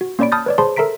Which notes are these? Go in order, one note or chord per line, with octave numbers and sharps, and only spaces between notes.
F#4
A#3 C#4 C#5 D5 B5 D7
A5 B5 D#6 F6 G6 A6
B4 C#5 D5
G#4 C5 A5 B5 C6
A4 A#4 E5 A#5 B6 D7